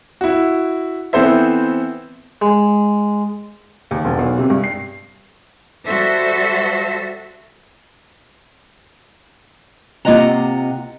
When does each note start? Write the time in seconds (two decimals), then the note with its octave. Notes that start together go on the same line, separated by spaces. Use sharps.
0.21 E4 F#4
1.13 E3 B3 C4 A4 C5 E5
2.42 G#3
3.91 D#2
4.05 E1
4.19 B1
4.39 C3
4.50 G2
4.64 C7
5.86 G3 F#4 A4 C5 E5
10.05 C3 A#3 F4 D#5 F#5 A#5